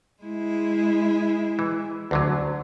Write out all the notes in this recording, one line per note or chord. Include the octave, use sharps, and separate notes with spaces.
G#3 E4
E3
D2 D3 F#3